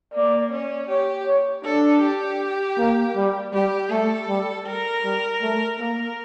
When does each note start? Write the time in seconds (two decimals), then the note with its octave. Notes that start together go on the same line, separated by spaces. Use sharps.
0.13 A#3 D5
0.51 C#4
0.89 G4 C#5
1.27 C#5
1.65 D4 A4
2.02 G4
2.78 A#3
3.16 G3
3.54 G3 G4
3.91 A3 A4
4.29 G3
4.67 A#4
5.04 G3
5.42 A3
5.80 A#3 A#4